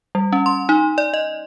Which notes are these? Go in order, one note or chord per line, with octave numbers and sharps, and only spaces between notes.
G3
C#4
C6
D#4
D5
D#5